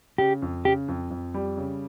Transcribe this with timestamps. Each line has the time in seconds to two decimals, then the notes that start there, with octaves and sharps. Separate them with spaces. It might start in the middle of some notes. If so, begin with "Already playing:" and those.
0.18 C#3 G4
0.42 F2
0.65 C#3 G4
0.88 F2
1.10 F2
1.34 G3
1.57 C#3